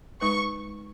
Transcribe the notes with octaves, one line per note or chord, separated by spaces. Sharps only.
G#3 D#4 B4 C#6